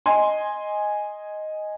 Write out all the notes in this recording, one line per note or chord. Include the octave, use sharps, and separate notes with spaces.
D#5 G#5 C6